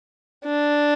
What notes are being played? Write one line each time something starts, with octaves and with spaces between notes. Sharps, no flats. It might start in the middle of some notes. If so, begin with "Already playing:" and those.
D4